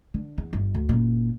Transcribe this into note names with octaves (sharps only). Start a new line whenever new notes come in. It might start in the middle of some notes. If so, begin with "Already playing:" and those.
D3
E2
G1
D2
F#1 A#2